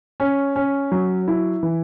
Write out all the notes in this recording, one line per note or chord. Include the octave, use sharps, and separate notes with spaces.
C#4
C#4
F#3
E4
E3